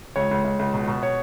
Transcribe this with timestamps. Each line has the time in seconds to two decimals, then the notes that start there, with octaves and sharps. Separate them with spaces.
0.16 C#2 C#5
0.31 C#2
0.44 C#2
0.59 C#2
0.74 B2
0.88 B2
1.03 C#5